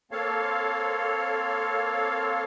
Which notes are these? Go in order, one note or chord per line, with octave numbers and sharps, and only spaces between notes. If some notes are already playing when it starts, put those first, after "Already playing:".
A#3 C4 A4 C#5 F5